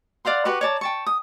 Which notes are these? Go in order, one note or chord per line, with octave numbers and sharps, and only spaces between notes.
D5 F5 F#5 C6
F#4 G4 B4 C#6
C#5 D5 A5 A#5
G5 A5 C#6
D#6